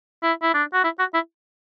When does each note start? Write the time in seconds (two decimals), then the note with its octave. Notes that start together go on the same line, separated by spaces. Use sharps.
0.23 E4
0.42 E4
0.54 D4
0.73 F#4
0.84 E4
0.99 F#4
1.14 E4